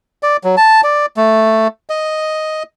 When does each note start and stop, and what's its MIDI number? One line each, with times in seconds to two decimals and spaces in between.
0.23 0.37 74
0.44 0.56 54
0.57 0.81 81
0.83 1.06 74
1.17 1.68 57
1.90 2.63 75